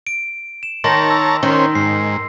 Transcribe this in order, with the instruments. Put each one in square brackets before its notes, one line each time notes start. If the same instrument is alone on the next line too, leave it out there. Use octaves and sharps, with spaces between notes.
[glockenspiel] D7
E7
[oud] D#3 [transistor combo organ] C#5 A5 A#5 [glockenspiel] C6 A#6
[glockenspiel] E6
[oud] D#3 [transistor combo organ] C#4 C5 [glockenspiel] C6
[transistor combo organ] G#2 [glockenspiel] C7